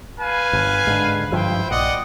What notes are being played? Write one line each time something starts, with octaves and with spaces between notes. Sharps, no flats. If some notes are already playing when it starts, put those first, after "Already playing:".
B4 F5 G#5
G1
G#2 D3
G2 F3 E4 C5 G5
A#1 D5 D#5 F#5